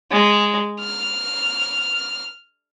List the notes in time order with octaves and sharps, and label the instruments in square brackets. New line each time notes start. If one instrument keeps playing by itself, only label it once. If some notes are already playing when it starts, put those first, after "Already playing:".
[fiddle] G#3
F6